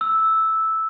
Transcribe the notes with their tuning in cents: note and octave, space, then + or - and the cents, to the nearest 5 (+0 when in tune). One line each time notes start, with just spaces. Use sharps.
E6 -10